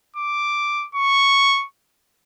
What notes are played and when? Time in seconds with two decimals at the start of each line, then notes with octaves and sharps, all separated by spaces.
0.16 D6
0.95 C#6